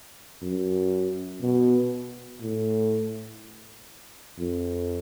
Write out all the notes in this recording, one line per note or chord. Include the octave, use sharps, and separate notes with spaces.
F#2
B2
A2
F2